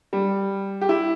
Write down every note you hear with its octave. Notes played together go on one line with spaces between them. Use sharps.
G3
G4
E4